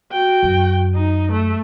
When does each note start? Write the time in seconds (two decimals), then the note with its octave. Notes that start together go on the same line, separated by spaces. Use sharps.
0.12 F#4 G5
0.43 F#2
0.95 D#4
1.32 A3